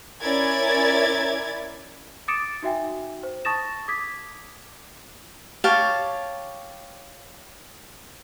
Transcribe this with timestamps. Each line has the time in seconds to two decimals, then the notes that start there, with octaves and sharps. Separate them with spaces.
0.22 C#4 E4 A#4 D5 G#6 A6
2.28 D6 D#6 A6 C#7 D7 E7
2.62 D#4 F#4 E5 G5 G#5
3.23 C5
3.45 A5 C#6 D#6 A6 A#6 E7
3.88 D6 D#6 G#6 B6
5.64 G4 C#5 F5 A5